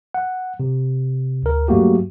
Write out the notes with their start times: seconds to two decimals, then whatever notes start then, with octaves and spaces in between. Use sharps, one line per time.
0.14 F#5
0.60 C3
1.43 D2 A#4
1.68 G2 F#3 A3 A#3 F#4 G4